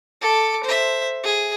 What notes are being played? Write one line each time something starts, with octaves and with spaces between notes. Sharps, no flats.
A4 D6
C5 E5
G#4